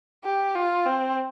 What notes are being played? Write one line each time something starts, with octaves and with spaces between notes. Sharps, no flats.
G4
F4
C4